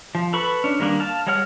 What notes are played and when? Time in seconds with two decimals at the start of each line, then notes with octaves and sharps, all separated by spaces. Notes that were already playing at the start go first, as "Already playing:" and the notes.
0.15 F3
0.33 A4 B4 B5 C#6
0.64 C#4 D4
0.80 D#3 G3 A#3 D4
1.00 F5 A5
1.27 G3 G#3 C#5 F#5 F6